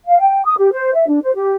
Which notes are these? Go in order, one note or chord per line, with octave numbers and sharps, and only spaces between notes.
F5
G5
D#6
G4
C5
E5
D4
C5
G4